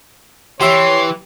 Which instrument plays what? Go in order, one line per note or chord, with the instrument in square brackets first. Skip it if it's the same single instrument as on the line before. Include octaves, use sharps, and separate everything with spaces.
[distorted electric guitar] E3 [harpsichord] G4 E5 [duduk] C#5 [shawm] C6